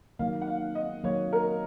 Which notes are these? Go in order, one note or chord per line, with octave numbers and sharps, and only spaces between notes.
D#3 F#3 A#3 F5
F#5
F5
D#5
D#3 F#3 A#3 C#5
A#4